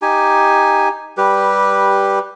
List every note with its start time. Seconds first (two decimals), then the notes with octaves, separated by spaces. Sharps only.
0.02 D#4 G4 G#5
1.17 G3 G4 B4